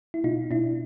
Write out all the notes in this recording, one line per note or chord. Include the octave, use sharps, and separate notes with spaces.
E4
B2 D#4 F4
B2 D4 E4